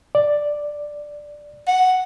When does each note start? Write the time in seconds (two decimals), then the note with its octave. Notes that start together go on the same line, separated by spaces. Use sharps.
0.15 D5
1.68 F#5